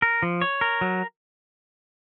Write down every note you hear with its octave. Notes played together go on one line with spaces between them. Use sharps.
A#4
F3
C#5
A#4
F#3